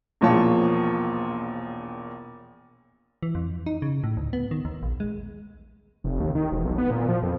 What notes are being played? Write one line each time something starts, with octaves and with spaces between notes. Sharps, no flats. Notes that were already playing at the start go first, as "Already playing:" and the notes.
E1 A#1 A#2 F3 C#5 A5
E3
F2
D#4
C#3
A2
D2
B3
D#3
D#2
A#1
G#3
F1
D#2
D#3
E1
B1
B3
A#2
F3
F2